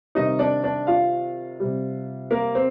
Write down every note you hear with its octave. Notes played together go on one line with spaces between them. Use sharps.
C3 D#3 G3 D#4 D#5
D4 D5
D4 D5
F4 F5
C3 G3
A#3 A#4
C4